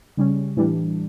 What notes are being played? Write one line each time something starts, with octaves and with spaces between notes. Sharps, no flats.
C#3 G3 C#4
A2 E3 G3 D4